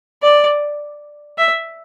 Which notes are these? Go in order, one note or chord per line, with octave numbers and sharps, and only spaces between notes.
D5
E5